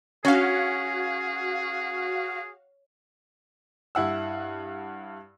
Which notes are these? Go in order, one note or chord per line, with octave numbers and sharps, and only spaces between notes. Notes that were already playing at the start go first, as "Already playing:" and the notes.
C#4 F#4 G#4 F5
G2 E4 F#5 E6